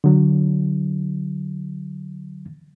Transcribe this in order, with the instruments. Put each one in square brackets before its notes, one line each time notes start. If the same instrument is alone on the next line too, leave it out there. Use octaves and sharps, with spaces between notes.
[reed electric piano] D3 F#3